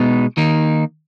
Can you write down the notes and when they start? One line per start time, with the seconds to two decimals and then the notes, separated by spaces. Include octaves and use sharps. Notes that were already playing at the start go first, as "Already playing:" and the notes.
Already playing: B2 G#3 B3 D#4
0.37 D#3 A#3 D#4